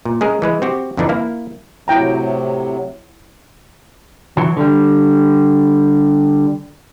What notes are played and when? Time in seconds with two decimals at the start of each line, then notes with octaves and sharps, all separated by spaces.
0.05 A#2
0.21 G#3 C#4 G#4 A#4
0.42 E3 G#3 B4
0.62 C4 F#4 G4
0.97 F2 D3 E3 D4 D#4
1.09 A#3 E4 F5
1.88 A2 C3 F#3 E4 G5 A#5
4.37 E3 F#3
4.57 D3 G3